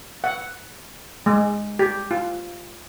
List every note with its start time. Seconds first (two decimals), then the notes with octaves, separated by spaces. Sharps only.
0.24 F#5
1.26 G#3
1.79 G4
2.11 F4